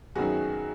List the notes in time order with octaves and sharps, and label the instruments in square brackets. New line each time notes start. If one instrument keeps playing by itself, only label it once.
[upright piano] F#2 D#3 F#3 B3 F#4 [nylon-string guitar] G#4